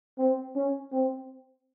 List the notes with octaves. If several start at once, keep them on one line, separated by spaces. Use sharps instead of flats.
C4
C#4
C4